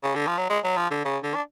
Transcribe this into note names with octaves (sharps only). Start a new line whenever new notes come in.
C#3
D3
F3
F#3
G#3
F#3
F3
D3
C#3
D3
D4